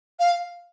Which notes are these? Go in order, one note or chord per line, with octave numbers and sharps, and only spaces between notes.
F5